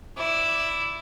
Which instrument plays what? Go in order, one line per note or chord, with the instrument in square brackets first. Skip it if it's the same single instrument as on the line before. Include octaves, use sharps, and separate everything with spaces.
[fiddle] E4 D5